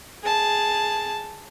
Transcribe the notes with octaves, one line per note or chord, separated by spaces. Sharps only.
G#4 A5